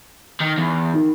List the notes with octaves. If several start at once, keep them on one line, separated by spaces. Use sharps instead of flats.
D#3
E2
D#3